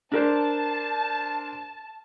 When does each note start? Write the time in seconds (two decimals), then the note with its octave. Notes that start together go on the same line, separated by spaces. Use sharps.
0.12 D4 A#4 C5 A5